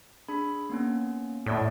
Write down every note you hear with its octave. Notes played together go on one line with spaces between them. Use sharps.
D4 G#4 B5
A#3 B3 C#4
A2 A3 C#5 D5